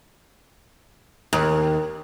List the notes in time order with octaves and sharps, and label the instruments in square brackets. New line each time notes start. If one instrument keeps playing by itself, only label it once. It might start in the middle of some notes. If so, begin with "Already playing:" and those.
[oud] D#2